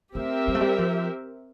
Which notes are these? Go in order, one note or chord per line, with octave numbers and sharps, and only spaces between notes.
A3 C4 G4 A#4 E5
G3
A3
G3
F3